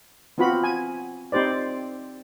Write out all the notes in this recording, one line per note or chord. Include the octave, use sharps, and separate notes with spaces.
B3 C4 F4 F#4 B5
G#5
C4 D#4 G4 C5 D5